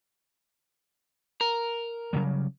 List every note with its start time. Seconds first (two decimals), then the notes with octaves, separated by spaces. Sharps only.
1.41 A#4
2.13 C#3 F#3 G3